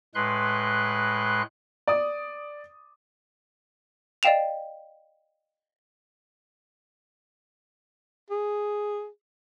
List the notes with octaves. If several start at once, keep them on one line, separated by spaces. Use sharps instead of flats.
A2 G#3 B4 C6 F#6
D5 D#6
D5 D#5 F5 G5 E7 F7
G#4